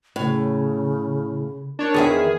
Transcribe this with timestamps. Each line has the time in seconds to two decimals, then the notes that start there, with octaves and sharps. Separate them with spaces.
0.16 A2 C#3
1.79 D4 A#4 C#5
1.94 E2 D#3 G#4 E5